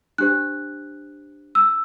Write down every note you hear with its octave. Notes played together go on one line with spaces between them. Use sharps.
D4 G4 C5 F#6
E6